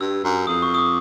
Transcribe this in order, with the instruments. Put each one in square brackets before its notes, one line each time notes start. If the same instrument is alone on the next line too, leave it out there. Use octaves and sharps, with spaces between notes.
[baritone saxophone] G2 [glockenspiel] E6
[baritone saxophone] F#2
[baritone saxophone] F2 [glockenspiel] D#6
[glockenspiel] C#6
D#6
D6